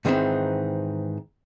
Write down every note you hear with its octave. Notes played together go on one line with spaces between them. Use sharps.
G#2 D#3 E3 B3 C4 D#4